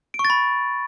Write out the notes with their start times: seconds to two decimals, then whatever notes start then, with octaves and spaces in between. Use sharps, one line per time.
0.14 D7
0.19 C#6
0.25 A6
0.30 B5